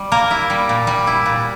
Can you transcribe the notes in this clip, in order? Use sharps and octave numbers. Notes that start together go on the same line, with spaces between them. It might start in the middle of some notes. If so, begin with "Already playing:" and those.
Already playing: G3
A#3 A#4
E4
G3
A#2
G3
E4
A#2